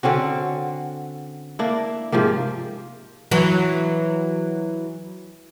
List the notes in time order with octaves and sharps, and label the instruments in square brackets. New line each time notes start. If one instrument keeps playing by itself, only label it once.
[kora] D3 C4 C#4 F#4
A#3 D4 E4
G#2 C3 F3 A#3
[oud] E3 F#3